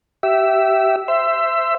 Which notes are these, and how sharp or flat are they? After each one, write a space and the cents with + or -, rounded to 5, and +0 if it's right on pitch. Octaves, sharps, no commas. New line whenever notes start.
G4 -25 E5 +0
C5 -5 E5 +15